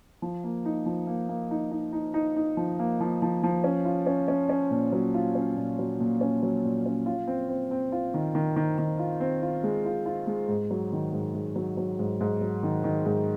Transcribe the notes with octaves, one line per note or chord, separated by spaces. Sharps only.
F3
A#3
D#4
F3
A#3
A#3
D#4
D#4
D#4
D#4
D#4
F3
A#3
F3
F3
F3
C#4
F4
C#4
C#4
C#4
A#2
F#3
F4
C#4
A#2
F#3
A#2
C#4
F#3
A#2
C#4
F4
C4
C4
C4
F4
D#3
D#3
D#3
D#3
F4
C4
F4
G#3
F4
F4
G#3
G#2
F#3
D#3
G#2
G#2
F#3
F#3
G#2
G#2
F#3
D#3
D#3
G#2